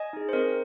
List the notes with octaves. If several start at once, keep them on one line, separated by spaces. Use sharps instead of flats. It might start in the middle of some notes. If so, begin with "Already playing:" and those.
Already playing: D#5 G#5
D#4 G#4
C5
C4 A#4 D#5